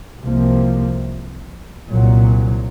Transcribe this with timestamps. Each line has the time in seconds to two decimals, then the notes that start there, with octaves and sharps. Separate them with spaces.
0.19 C2 C3 F3 A#3
1.89 C2 A#2 F#3